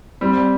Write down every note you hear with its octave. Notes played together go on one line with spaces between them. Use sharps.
G3 C4